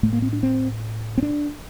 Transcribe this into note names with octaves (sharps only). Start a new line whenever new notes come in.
A2 A3
A#3
C4
D4
C4
C4
D4